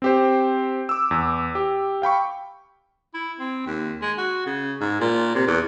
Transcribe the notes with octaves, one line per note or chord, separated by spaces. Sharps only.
C4 G4 C5
D6 E6
E2
G4
F5 G5 B5 C#6
E4
C4
D#2
G#3
F#4
C#3
G#2
A#2
C3
E2